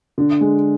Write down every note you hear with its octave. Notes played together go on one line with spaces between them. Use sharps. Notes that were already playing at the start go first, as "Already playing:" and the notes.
D3
G#3